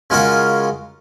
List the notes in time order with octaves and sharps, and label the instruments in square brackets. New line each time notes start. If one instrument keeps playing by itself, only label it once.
[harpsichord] C#3 G#3 F4 F#4 A#4